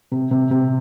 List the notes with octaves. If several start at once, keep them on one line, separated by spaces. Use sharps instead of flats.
C3
C3
C3